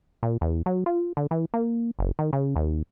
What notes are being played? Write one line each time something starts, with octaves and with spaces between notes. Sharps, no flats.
A#2
E2
F#3
F4
D3
E3
A#3
F#1
D#3
C#3
D#2